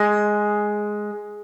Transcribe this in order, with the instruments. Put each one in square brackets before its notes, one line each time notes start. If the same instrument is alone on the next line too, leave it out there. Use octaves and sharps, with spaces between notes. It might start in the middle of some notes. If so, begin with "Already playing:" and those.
Already playing: [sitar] G#3